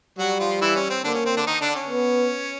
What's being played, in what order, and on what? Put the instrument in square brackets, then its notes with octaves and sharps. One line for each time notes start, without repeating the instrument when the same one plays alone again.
[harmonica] F#3 F#4 [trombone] G3
[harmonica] F3 F4
E3 E4
C#4
C4
[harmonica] D3 D4 [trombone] A#3
[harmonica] C#4
C4
D3 D4
D#3 D#4
D3 D4
C#4
[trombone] B3